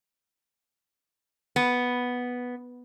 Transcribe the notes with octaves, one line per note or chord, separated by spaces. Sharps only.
B3